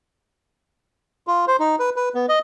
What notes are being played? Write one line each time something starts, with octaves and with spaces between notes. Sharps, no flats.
F4
C5
D#4
B4
B4
B3
D#5